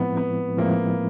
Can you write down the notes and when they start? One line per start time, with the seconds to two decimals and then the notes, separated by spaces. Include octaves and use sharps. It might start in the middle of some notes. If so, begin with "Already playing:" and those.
Already playing: A2 F3 G#3 B3 C4 E4
0.17 B3
0.57 A2 F3 G#3 A#3 C4 E4